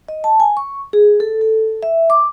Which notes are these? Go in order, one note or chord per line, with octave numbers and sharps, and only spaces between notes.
D#5
A5
G#5
C#6
G#4
A4
A4
E5
D6